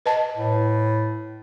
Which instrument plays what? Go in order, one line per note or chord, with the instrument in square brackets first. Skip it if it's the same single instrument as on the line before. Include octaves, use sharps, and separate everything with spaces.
[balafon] B4 D#5 A5
[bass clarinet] A2